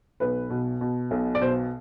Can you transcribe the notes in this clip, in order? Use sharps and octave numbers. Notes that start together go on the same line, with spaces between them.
B1 B4
B2
B2
B1
D5
B2 C5